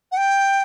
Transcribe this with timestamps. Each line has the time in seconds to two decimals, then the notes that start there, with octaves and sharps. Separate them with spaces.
0.12 F#5
0.17 G5